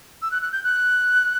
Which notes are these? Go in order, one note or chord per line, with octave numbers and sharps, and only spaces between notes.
E6
F#6
F#6
G6
F#6